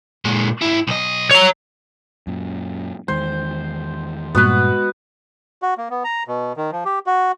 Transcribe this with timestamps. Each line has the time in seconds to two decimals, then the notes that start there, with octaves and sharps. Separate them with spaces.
0.25 A#2 G#3
0.62 G#2 E4
0.87 B1 D#5
1.31 C#5 A#5
2.27 F#2 A#2
3.08 E2 D#3 G#3 C5
4.35 G2 A#2 G#3 B3 F#4 B4
5.62 F#4
5.78 A#3
5.90 B3
6.04 A#5
6.28 B2
6.57 D#3
6.72 F3
6.85 G4
7.07 F#4